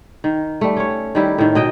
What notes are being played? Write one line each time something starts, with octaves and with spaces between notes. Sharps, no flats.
D#3
G3 A3
C#4 C#5
D#3 G3 E4
A2 D#3
B2 D#5 G5